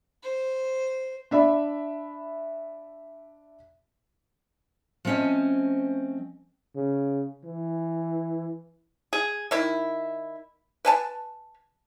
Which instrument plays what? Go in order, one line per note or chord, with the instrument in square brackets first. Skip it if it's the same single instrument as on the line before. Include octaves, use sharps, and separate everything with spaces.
[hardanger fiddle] C5
[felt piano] D4 E5 B5
[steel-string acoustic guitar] F3 A3 C4 C#4 C5 D#5
[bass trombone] C#3
E3
[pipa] G#4
D#3 E4
B4 G#5 A5